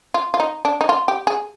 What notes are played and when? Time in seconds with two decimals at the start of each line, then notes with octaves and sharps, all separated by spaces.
0.14 F4
0.34 F4
0.40 D#4
0.65 D4
0.81 D#4
0.89 F4
1.08 G4
1.27 G#4